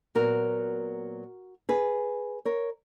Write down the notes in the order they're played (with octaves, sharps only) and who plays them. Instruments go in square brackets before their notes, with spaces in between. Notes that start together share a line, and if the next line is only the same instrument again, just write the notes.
[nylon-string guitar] A#2 F#3 B3 F#4 A#4
G#4 B4
A#4 C#5